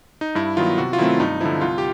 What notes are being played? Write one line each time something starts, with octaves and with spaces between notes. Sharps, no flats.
D#4
G2 E4
D#3 F#3 B3 F4
C3 F#4
F4
D#3 F#3 A3 C4 E4
G2 D#4
D3 F3 E4
C2 F4
G4